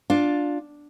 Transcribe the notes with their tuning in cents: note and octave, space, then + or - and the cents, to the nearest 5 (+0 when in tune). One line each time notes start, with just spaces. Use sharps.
D4 +0 F4 +15